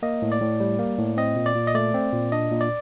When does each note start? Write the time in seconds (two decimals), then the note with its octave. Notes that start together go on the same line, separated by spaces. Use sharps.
0.03 A#3 D#5
0.22 A2
0.32 D5
0.41 A2
0.60 G3
0.79 A#3
0.98 A2
1.17 C4 D#5
1.36 A#2
1.46 D5
1.55 A#2
1.67 D#5
1.74 A3 D5
1.94 C4
2.13 A#2
2.32 D4 D#5
2.51 A#2
2.61 D5